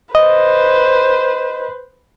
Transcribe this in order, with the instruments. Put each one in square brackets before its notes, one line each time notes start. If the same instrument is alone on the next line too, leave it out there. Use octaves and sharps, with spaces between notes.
[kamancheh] B4 C5 [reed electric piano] D#5